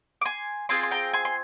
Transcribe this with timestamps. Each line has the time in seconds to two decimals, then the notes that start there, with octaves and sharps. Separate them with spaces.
0.21 D6
0.25 G#5 C6
0.69 C4 F4 G#4 G#5 C6
0.83 C6
0.91 G5 A#5
1.13 G#5 C6
1.25 C6